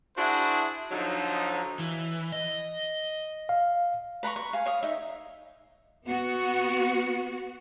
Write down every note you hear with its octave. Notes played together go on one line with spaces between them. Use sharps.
D4 E4 F#4 G#4 C5
D3 F3 F#3 D#4
E3
D#5
F5
B4 A#5 B5 C#6
C#6
F5 G#5
C#5 F5 D#6
D#4 E5
B3 F#4